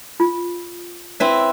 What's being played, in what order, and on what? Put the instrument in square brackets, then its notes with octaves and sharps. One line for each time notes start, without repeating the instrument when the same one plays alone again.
[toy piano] F4
[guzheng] C4 E4 B4 [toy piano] C#5